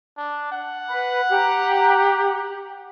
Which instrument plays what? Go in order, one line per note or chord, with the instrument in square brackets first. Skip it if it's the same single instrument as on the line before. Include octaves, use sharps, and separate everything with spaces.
[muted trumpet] D4
F#5
[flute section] B4 B5
G4 A#5